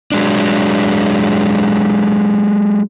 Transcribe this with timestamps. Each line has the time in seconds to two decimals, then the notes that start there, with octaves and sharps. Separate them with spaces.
0.12 F#3 G#3 D4